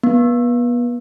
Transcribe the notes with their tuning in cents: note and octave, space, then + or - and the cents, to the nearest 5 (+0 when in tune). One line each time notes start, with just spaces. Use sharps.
B3 -30